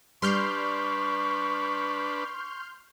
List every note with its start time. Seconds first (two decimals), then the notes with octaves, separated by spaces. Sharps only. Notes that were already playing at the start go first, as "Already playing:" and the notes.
0.22 G3 D4 B4 C6 C#6 F6 G6